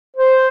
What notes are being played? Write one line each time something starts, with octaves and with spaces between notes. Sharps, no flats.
C5